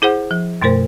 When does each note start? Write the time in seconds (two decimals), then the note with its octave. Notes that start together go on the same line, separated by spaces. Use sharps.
0.02 E4 G#4 C5 F#5
0.31 F3
0.62 F#2 B2 A3 A#4 C5